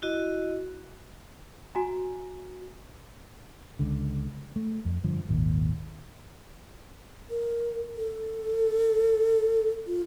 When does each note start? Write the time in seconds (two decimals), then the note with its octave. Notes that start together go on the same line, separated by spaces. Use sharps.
0.02 E4 F#4 D#5
1.75 F#4 G#5 A#5
3.79 C#2 D3
4.56 A3
4.85 F2
5.04 G2 D3 F3
5.29 G#1 D#2 A#2 D#3
7.30 A#4
7.97 A4
9.87 F4